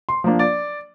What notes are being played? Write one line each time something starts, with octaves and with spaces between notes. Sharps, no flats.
C6
F3 A#3 D4
D5